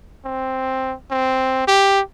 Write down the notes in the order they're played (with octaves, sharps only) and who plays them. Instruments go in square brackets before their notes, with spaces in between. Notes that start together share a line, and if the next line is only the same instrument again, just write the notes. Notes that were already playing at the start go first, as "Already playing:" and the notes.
[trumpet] C4
C4
G4